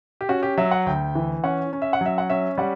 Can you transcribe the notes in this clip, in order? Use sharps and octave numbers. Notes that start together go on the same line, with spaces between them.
G4
C#4 F#4
G4
F#3 E5
F#5
D2 G5
E3
C#4 F#5
C#4
E5
F#5
F#3 E5
F#5
C#4 E5
G3 F#5